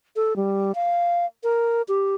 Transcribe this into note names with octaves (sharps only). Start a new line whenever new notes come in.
A4
G3
F5
A#4
G4